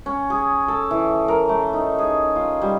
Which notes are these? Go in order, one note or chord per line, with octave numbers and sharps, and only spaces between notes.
C#4
G#4
A4
E3
A#4
A3
D#4
G#4
F4
G3